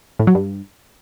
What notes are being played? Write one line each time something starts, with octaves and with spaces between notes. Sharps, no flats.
A2
F#3
G2